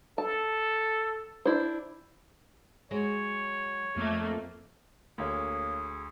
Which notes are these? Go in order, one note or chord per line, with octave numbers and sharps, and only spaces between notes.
A4 A5
D4 E4 C5
F#3 G#3 C#5
F2 A3 A#3
D2 A#3 G#4 C#5